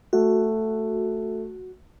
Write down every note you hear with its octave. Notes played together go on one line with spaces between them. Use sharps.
A3 F#4